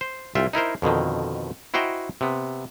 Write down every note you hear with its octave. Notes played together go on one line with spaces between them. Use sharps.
C5
C2 F4 E5 G5
D#4 E4 A#4 C5
F2 B2 D3 D#3
E4 F#4 C5 D#5 G5 A#5
C3 B3